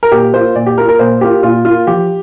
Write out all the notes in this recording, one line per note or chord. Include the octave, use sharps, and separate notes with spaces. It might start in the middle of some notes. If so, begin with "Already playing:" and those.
A#4
A#2 G4
A#3 F4 C5
A#2 D5
G4
A#3 F4 A#4
A#4
A#2 C5
A#3 F4 G4
A#2 F4
A#3 F4
F3 G4